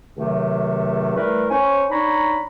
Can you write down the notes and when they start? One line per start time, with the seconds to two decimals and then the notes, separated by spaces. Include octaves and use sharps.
0.16 C#2 C3 D#3 F#3 A3
1.14 E3 G3 A3 A#4 B4
1.50 C#4 C5 C#5 G#5
1.90 D4 D#4 C#5 A#5 B5